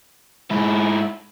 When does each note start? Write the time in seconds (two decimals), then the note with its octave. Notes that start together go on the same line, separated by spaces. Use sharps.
0.51 G#2 E4